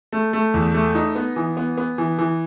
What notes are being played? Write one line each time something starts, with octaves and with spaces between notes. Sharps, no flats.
A3
A3
E2
A3
D#4
B3
E3
B3
B3
E3
E3